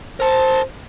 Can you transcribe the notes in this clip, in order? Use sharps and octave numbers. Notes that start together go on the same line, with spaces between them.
A#4 C5 A5